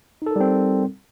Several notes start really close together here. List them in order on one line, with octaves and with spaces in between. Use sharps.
D#4 A4 A#4 G3 C4